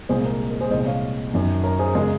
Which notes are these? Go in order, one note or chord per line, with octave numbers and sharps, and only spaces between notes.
C2 A#2 G#3 G#4 C5
A#4
G#4
A#4
G#4 C5
C2 A#2 G#3 C5 D#5
C#5 F5
F#2 D#3 F#3
A#4 C#5
G#4 C5
C#3 G#3 A#4